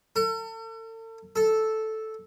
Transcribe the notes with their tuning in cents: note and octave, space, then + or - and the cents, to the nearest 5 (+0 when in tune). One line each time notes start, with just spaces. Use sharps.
A4 +40
A4 -5